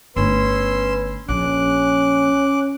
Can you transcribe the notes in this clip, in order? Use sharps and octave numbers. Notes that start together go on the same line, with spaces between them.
G1 A3 C#4 B4 C6 E6
A#1 C#4 D6 F#6